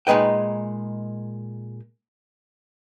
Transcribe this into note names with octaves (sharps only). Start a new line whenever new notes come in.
A#2 G#3 D#4 B4 G5